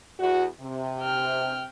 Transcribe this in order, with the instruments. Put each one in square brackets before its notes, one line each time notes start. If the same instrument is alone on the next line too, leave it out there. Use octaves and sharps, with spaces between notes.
[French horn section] E2 F#4
C3
[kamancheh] G5 F6